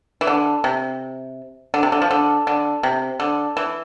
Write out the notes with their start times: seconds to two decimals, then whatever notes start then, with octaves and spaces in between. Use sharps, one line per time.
0.21 E3
0.27 D3
0.64 C3
1.74 D3
1.83 C3
1.92 D3
2.02 F3
2.11 D3
2.47 D3
2.83 C3
3.20 D3
3.57 E3